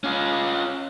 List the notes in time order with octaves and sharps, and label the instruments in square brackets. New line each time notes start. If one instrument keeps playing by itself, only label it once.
[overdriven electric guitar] C#4 F4